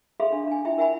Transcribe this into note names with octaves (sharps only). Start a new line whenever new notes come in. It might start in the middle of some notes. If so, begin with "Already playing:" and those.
G#4 A4 E5 F5 B5 C6
D4
D4 G#5
E4 F4 E5 G5 B5
A#4 E5 F#5 G#5 B5